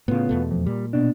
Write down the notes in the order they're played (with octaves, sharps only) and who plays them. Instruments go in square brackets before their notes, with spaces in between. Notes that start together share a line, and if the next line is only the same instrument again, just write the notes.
[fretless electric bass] A2 C#3 [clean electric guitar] B3 F4
[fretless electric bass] E2 B2 A3
[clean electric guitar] F2
[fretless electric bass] A#2 [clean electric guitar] G3
[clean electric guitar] B2 D4